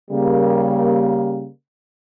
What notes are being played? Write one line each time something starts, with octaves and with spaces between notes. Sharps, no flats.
C#3 G3 A#3